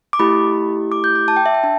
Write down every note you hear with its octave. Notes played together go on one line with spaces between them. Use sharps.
D6
A3 E4 G4 B5
D6
G6
D6
A5
G5
E5
G5
D4 A5